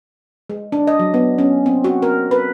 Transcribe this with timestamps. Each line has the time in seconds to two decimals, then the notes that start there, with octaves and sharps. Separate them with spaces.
0.49 G#3
0.72 D4
0.87 D#5
0.99 F#3
1.14 B3
1.38 C#4
1.66 C4
1.84 F#4
2.02 A#4
2.31 B4